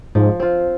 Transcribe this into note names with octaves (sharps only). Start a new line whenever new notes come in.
G#2 F3
C4 F4